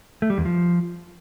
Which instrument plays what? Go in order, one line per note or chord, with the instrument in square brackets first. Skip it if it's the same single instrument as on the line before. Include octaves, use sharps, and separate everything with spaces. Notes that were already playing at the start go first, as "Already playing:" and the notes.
[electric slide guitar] A3
G3
E2
F3